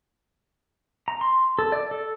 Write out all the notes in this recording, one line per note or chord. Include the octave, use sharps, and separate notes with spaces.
A#5
C6
A4
D5
A4